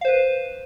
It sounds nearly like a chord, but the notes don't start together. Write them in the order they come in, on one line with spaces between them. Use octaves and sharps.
F5 C5 B4